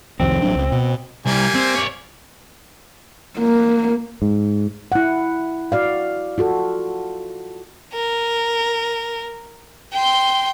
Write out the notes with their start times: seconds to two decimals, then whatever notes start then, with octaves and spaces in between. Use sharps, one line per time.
0.20 C2 F2 D#3 C4
0.42 A1 F#3 D4
0.56 C#2
0.72 B2
1.26 C2 G3 A#3 G#5
1.55 C4
1.75 C#5 D5
3.38 A#3
4.22 G#2
4.92 E4 F#5
5.72 F#4 D5 F5
6.38 F4 F#4 A4
7.93 A#4
9.92 G5 C6